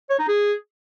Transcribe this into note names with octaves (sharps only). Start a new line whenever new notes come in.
C#5
D#4
G#4